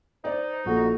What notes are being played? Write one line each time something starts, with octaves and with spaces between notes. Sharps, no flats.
D#4 C5 D5
A#1 F#4 A4